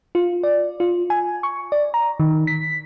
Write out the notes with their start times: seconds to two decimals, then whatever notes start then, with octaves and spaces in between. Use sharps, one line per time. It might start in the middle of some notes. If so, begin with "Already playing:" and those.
0.15 F4
0.43 D5
0.80 F4
1.10 G#5
1.43 C#6
1.72 D5
1.94 A#5
2.20 D#3
2.47 B6